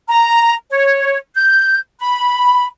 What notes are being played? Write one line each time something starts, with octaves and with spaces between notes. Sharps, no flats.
A#5
C#5
G6
B5